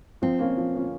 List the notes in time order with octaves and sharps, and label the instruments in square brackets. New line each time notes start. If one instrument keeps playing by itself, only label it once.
[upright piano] F3 [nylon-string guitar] C4
[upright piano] A#3 C#4 F4
F3
A#3 C#4 F4